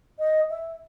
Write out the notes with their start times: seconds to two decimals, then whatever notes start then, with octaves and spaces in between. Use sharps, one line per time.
0.19 D#5
0.50 E5